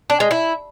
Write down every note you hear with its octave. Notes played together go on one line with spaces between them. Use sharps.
D4
G#3
E4